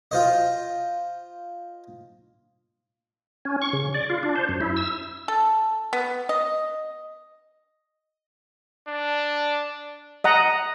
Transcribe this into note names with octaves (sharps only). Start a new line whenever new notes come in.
F4 C5 D#5
C#4
C#6
C#3
D5
F4
D4
C5
F#2
E4
E6
A4
B3
D#5
D4
D#5 F#5 A#5 D#6